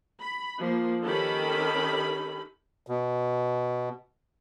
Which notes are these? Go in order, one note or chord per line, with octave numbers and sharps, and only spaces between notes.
B5
F3 A#3
D#3 C#4 G4 A4 B5
B2